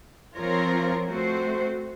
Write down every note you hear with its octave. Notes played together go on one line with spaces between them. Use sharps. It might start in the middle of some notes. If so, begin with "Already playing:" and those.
F3 C4 F4 A#4 C#5
A3 C4 F#4 C5